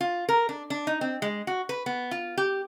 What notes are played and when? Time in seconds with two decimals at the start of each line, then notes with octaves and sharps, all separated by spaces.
0.01 F4
0.29 A#4
0.49 D4
0.70 D4
0.87 D#4
1.01 C4
1.22 G#3
1.47 F#4
1.69 B4
1.86 B3
2.11 F4
2.37 G4